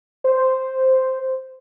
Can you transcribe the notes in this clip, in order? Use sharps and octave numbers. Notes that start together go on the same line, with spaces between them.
C5